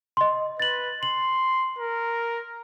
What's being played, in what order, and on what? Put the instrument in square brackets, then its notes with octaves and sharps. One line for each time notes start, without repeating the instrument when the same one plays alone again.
[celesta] D#5 C6
[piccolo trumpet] B4 [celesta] A6 F#7
[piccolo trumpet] C6 [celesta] F#7
[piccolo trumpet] A#4